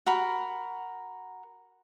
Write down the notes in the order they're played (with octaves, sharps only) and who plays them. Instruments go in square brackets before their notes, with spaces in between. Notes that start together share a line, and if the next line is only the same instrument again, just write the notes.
[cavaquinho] F#4 A#4 B5